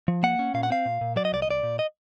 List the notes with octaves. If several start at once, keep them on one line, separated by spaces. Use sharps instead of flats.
F3
A#3 F#5
C#4
A#2 F5
F#5
C4 F5
A#2
A#2
F#3 D5
D#5
C2 D5
D#5
C2 D5
A#2
D#5